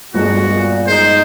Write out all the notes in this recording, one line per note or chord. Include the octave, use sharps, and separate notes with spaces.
G1 D2 A#2 G#3 F#4
A#2
B1 G#3 D#4 C5